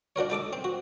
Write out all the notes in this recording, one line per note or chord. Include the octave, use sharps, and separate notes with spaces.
D4 F#4 A#4 C#5
D#4 A4 D6 D#6
C4
F#4